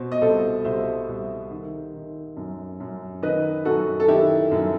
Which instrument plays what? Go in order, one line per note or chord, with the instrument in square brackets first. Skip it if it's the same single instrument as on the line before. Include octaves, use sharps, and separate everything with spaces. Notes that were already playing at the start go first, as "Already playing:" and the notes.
Already playing: [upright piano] B2 C5
D#5
C2 A4 C5
C2 C5 E5
C2
D#3
D#3
F#2
F#2
D#3 B4 D#5
F#2 F#4 A4
A4
D#3 E4 G4
F#2